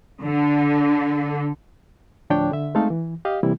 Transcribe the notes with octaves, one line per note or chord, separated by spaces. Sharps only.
D3
D2 A2 F3 D4 C#5 G5
D3 E5
G#3 A3 C4 D#4 A4 F5
E3
G4 D#5 F5
C3 E3 G3 A#3 E4